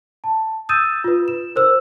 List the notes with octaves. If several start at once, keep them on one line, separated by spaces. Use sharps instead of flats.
A5
D#6 E6 G6 A6 D#7 E7
F4 B4
E7
A#4 C5 E6